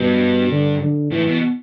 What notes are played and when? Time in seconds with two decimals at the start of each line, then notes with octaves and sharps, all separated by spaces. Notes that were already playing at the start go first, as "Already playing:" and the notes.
Already playing: G2 B2
0.50 D3
0.82 D3
1.11 A2 E3
1.27 B2